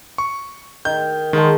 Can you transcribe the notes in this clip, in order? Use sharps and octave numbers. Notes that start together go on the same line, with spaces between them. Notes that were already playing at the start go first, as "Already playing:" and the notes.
C#6
D#3 G6
D#3 G#3 F#5 A5